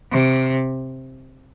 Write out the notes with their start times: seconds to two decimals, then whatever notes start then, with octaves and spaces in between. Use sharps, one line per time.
0.12 C3